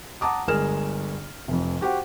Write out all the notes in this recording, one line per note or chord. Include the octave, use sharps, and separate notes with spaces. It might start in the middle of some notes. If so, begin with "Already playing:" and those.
F#5 A5 A#5 D6 D#6
G1 G#3 G#4 A#4 F6 E7
F1 F2
F#4 G4 C5 F#5